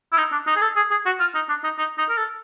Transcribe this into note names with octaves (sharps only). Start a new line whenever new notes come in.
E4
D#4
D4
D#4
G#4
A4
G#4
G#4
F#4
F4
D#4
D4
D#4
D#4
D#4
A#4
A4